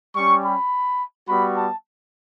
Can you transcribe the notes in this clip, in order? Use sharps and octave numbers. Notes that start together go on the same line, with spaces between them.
G3 C#4 G4 C#6
B5
G3 B3 F#4 B5
A5